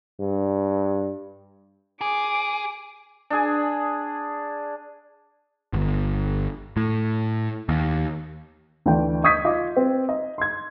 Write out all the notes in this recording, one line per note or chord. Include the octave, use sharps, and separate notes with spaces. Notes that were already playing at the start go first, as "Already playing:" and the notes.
G2
G#4 D6
D4 G#4
G1
A2
D#2
D2 E3 D4 G5
D#5 C#6 D#6 G6 G#6 B6
F4 D#5 D6
C4
D#5
C6 G#6